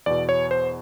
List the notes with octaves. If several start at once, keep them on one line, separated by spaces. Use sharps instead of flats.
E2 B2 D5
C#5
C5